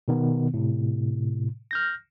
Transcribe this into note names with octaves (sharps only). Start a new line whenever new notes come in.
B2 D#3 B3
A2 C3
F6 G6 A#6